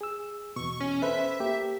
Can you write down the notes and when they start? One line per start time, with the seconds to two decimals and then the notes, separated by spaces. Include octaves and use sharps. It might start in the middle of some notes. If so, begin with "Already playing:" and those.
0.01 G#4 E6
0.56 E2 B2 C#6
0.81 C#4
1.02 A4 B4 C5 E5
1.40 A#3 G4